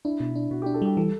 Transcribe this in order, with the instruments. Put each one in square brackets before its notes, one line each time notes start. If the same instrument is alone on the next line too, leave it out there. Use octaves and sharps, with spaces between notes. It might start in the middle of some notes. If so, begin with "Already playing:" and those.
[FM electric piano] D4 [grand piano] E4
[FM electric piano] B2
D4
[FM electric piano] B2 [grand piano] F#4
[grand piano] G4
[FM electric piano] D4
[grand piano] A4
[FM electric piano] G3 [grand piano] G4
[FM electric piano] E3 [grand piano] A4